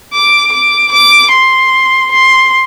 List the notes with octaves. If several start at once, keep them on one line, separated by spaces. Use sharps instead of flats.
D6
D6
D6
C6
C6